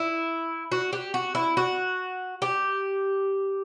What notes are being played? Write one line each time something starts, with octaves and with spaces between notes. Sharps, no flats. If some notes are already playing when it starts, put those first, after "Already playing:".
Already playing: E4
F#4
G4
F#4
E4
F#4
G4